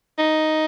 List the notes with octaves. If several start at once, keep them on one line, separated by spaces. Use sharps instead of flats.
D#4